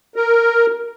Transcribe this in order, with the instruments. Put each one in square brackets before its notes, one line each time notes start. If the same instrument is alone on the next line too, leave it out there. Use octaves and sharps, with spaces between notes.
[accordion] A#4